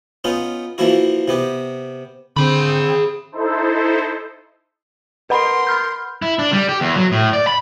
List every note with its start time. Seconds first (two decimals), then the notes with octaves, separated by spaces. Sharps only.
0.24 B3 C#4 D#4 F4
0.78 E3 F3 A#3 E4 F#4
1.28 C3 B3 G4
2.37 D3 C4 G#4 B5
3.32 D#4 E4 A4 C5
5.30 A#4 B4 F#5 B5 C6
5.67 B5 F6 G6
6.22 E4
6.39 D4
6.53 G3
6.69 G4
6.81 E2
6.96 F#3
7.12 A2
7.33 D5
7.47 B5